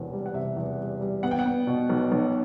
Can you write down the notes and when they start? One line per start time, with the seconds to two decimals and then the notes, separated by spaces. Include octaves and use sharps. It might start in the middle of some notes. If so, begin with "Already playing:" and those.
Already playing: E1 E2 C3
0.13 G3
0.26 F#5
0.34 C3 E5
0.56 E2
0.79 G3
1.01 G3
1.23 B3 F#5
1.31 G5
1.39 F#5
1.46 B3
1.67 B2
1.90 B1
2.12 B1